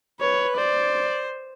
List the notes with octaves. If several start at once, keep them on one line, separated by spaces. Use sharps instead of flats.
B4 C#5
C5 D5